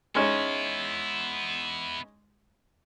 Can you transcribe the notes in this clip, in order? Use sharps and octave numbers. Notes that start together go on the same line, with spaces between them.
G#3 B3 C#4 D#4 E4